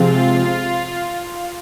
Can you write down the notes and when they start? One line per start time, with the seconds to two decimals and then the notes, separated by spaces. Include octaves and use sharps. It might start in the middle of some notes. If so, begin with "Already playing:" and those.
Already playing: C3 F3 G#3 C4 F4